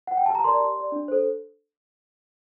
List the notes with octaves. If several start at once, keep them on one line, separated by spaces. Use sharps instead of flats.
F#5
G5
G4 A5
A#5
A#4 D5 C6
G4
D5
D4
A4 C5